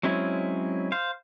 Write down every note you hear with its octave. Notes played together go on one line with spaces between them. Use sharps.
F#3 G#3 C4 C#4 E4
C5 F5